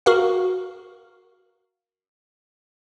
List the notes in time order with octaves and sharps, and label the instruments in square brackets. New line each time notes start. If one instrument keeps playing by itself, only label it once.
[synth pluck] F#4 A#4 F5